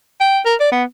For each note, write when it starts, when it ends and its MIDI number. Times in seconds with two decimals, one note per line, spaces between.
0.21 0.40 79
0.46 0.55 70
0.60 0.67 74
0.72 0.84 59